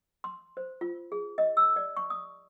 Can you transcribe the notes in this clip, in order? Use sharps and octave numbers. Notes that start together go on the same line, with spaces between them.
C6
C5
F4
G#4
D#5
E6
D5
C#6
D#6